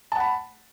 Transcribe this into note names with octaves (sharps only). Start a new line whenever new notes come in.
F#5 A5 B5